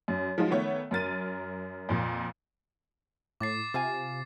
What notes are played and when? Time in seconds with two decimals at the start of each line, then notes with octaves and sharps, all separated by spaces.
0.08 F#2
0.38 F3 F#3 G#3 D#4 F4
0.50 D#3 A3 B3 C#5
0.91 F#2 A#4 A6 D#7
1.89 F2 A#2
3.41 A2 D6 A6 C7
3.74 C3 F4 F5 G#5